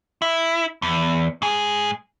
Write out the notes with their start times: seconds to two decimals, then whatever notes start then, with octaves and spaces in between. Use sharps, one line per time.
0.22 E4
0.82 E2
1.42 G#2 G#4